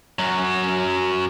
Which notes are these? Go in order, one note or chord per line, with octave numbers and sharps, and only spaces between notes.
F#2 F#3